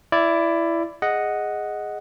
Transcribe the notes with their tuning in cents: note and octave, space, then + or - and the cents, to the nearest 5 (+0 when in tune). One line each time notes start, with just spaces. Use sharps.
E4 +15 D5 -5
G#4 +0 D#5 +0 F#5 +0